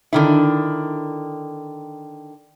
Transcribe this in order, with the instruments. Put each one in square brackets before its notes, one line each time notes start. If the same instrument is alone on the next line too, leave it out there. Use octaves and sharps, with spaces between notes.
[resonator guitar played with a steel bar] D3 D#3 E4